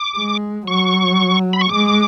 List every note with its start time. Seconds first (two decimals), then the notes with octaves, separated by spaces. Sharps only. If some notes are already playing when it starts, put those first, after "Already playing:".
Already playing: D6
0.16 G#3
0.67 F#3 C#6
1.53 B5
1.61 C#6
1.69 G#3 D6